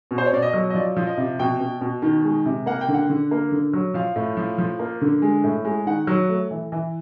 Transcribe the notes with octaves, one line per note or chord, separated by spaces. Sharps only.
B2
C5
C#5
B2 D5
D#5
F#3
D#5
F3 D5
F3
D#5
C3
B2 G5
B2
B2
D#3
G#3
C3
A#3 F#5
G5
D3
F#5
D3
A#3
D3
F#3
F3 F5
A2
F3
F3
A#3
D3
G#3
A2
G#3
D#3 F#5
F#3
A3
E3
E3